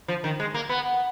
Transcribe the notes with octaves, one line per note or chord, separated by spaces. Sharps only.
F3
D#3
G#3
A#3
B3